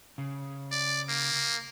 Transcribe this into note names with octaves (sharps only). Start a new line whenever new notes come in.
C#3
D5
A#3